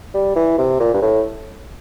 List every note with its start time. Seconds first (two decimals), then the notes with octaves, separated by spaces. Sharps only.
0.14 G3
0.36 E3
0.58 C3
0.80 A#2
0.94 G2
1.02 A2